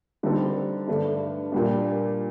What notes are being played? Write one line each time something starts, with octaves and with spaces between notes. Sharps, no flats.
D3 G3 C4 D#4 A4
G2 D3 A3 D4
A#2 G3 D4